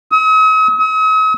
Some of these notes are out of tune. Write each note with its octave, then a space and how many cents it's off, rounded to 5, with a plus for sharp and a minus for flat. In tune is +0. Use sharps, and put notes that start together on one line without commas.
D#6 +45
D#6 +45